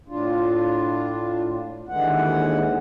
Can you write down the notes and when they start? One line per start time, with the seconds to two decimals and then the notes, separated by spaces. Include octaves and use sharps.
0.08 A2 D4 F4
1.89 D#2 D3 E3 G#3 F#5